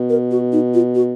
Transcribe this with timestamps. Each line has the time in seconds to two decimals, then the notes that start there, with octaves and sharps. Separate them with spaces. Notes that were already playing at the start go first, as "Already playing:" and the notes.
Already playing: B2
0.10 A#4
0.31 F#4
0.52 D#4
0.74 F4
0.95 F#4